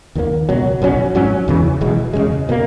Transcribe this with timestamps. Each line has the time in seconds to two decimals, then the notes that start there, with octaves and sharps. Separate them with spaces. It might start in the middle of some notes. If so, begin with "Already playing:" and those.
0.15 D#2 D#3 F#3 A#3
0.49 C#2 B2 F#3
0.82 B1 B2 F#3 C#4
1.15 G#2 F#3 C#4
1.48 E2 C#3 E3
1.81 E1 E2 B2 G#3
2.13 E1 D#2 C#3 G#3
2.49 B2 F#3 A#3